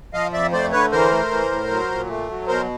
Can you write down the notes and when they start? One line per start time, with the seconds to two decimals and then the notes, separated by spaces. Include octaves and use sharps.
0.14 F3 D#5 F5
0.33 F2 D5 E5
0.52 A3 C5 D5
0.72 D3 B4 C#5
0.92 E3 A#4 C5
1.12 A3
1.31 E3
1.51 A2
1.71 F#3
1.90 A#2
2.09 A3
2.29 F#3
2.48 B2 A#4 C5